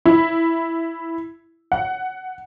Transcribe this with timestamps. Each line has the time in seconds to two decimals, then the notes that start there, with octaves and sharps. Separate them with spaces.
0.05 E4
1.72 F#5